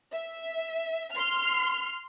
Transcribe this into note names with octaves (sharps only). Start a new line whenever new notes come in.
E5
C6 F6